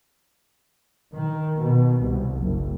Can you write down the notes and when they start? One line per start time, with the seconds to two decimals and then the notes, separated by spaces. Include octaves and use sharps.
1.14 D#3
1.59 B2
2.03 C2
2.38 F#1